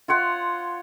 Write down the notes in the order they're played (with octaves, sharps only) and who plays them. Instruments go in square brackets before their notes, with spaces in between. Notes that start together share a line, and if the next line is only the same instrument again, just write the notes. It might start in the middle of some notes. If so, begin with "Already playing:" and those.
[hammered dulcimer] F4 C#5 F#5 C6